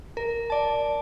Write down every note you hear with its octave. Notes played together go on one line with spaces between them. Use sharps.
A#4
D5 A5